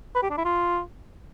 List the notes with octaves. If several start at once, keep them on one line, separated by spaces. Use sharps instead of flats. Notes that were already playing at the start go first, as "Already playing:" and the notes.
B4
G4
D4
E4
F4